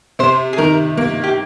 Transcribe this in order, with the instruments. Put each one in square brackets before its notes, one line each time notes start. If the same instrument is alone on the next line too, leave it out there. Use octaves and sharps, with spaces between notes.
[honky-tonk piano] C3 [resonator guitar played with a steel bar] C5
[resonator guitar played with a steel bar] G#4
[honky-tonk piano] D#3 [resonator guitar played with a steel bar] A#4
[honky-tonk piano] A#3
[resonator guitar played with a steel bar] G4